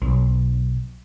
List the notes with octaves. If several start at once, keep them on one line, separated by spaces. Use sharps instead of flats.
B1